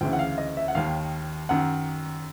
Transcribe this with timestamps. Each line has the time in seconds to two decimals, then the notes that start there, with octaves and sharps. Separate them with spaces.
0.01 D2 C#3 E3 G5
0.13 F#5
0.19 F5
0.38 D#5
0.57 E5
0.68 F#5
0.75 D#2 D#3 F5
1.49 F#2 D#3 F#5